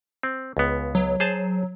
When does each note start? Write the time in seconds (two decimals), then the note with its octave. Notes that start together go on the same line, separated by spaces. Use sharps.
0.23 C4
0.57 C#2 B3
0.95 F#3
1.20 G#4 C5 A5